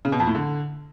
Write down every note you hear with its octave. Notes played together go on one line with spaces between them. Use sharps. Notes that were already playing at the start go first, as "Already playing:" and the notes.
C#3
B2
F2
A2
D3